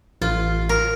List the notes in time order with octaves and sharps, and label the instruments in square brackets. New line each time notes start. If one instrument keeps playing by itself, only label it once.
[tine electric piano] A1 [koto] F4
[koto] A#4